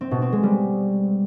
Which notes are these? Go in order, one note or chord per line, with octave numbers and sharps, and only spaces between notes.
C4
B2
C4
G#3
G3